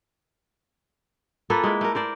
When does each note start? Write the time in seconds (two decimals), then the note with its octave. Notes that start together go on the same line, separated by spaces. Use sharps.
1.50 A#3 F4 A4 B4
1.64 G#3 E4
1.81 A3 A#4
1.95 A#4 C5 D5